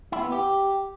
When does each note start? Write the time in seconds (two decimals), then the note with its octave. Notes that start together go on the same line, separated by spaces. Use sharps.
0.12 E4
0.22 B3
0.32 G4